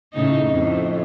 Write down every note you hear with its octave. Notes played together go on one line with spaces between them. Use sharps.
A2 C#3 D#4
F2 A2